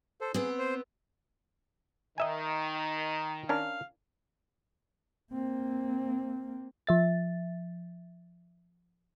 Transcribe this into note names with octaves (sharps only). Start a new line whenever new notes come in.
A4 C5
B3 C4 G#4
C5
D#3 D#4 D#5 E5 G#5
C#4 D4 A#4 F5
A#3 C4
F3 E5 A6